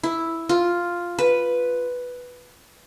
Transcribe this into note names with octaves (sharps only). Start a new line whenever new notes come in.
E4
F4
B4